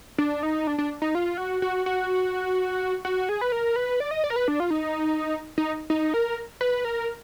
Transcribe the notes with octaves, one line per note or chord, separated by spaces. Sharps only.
D4
D#4
D4
D4
D#4
F4
F#4
F#4
F#4
F#4
G#4
B4
A#4
B4
D5
D#5
D5
A#4
B4
D4
F4
D#4
D#4
D#4
A#4
B4
A#4